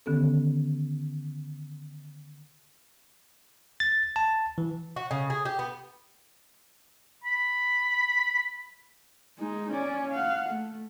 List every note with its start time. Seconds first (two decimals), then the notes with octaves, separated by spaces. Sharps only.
0.06 D3 D#3 B3 C#4 G4 A4
3.80 A6
4.16 A5
4.58 E3
4.96 F#4
5.11 C#3
5.30 G#4
5.45 G4
5.59 B3
7.24 B5
9.38 G#3 D#4
9.71 C#4 D5
10.10 F5 F#5
10.50 A3